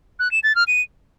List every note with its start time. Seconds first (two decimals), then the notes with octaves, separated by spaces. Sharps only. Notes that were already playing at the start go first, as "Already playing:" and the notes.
0.19 F#6
0.31 E7
0.43 A6
0.55 F6
0.67 D#7